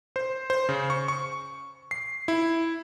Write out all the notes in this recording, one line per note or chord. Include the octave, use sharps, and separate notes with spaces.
C5
C5
C#3
C#6
C#6
C7
E4